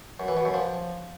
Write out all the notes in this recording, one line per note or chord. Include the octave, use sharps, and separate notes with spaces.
F#2
E3
B2
F#2
F3